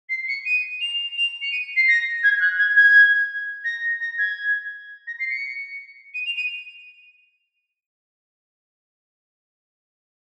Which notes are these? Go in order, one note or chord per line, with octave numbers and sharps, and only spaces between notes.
C7
C#7
D#7
F7
F7
C#7
D#7
C7
A#6
G#6
F#6
G#6
G#6
A#6
A#6
G#6
A#6
C7
C#7
D#7
F7
D#7